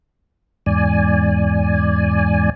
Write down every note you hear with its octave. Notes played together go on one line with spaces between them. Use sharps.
E2 G#2 D5 G#5